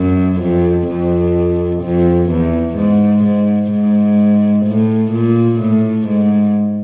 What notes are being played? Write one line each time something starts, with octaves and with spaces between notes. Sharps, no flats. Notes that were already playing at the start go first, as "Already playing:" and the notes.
Already playing: F#2
F2
F2
F2
E2
G#2
G#2
G#2
A2
A#2
A2
G#2